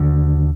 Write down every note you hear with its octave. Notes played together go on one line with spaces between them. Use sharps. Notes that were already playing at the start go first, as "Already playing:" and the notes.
Already playing: D#2 D3